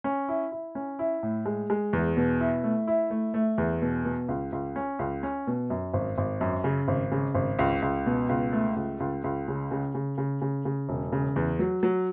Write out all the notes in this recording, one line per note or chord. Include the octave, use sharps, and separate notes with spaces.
C#4
E4
E4
C#4
E4
A2
G#3
G#3
E2
B2
E4
A3
E4
A3
A3
E2
B2
B2
C#2
C#2
C#4
C#2
C#4
B2
F#2
G#1
G#1
F#2
C#3
G#1
C#3
G#1
C#2
C#2
B2
C#2
A3
C#2
C#2
C#2
C#3
C#3
C#3
C#3
C#3
C#3
E1
C#3
E2
F#3
F#3